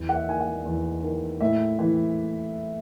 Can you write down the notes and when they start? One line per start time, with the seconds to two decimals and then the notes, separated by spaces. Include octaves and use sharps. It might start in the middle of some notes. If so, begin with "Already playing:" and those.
Already playing: E2
0.09 F#5
0.14 E5
0.27 D#3 G#5
0.40 F#5
0.65 E2
1.03 D#3
1.40 A2 E5
1.79 E3